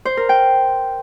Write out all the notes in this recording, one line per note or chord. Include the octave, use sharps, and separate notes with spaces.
C5
A#4
G5